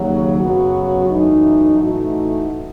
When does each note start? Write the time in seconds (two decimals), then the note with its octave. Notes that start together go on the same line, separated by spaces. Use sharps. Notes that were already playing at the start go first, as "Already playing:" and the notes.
Already playing: D#2 C#3 F#3
0.38 F#2 C#3 F#3 B3 F#4
1.07 F#2 E3 A3 D#4
1.77 A2 E3 A3 D#4 F#4